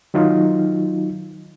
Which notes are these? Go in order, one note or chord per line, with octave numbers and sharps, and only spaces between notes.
D#3 F#3 D#4 F4